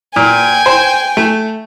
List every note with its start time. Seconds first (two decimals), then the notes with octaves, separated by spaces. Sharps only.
0.16 A#2 G5 G#5
0.66 C5
1.17 A3